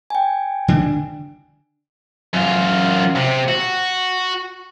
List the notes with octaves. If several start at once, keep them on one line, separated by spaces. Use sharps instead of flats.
G5 G#5
D3 D4
F#2 F4
C3
F#4